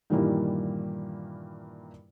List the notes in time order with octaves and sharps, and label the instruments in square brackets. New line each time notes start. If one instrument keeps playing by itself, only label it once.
[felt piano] G2 A#2 D#3 E3 G3 A#3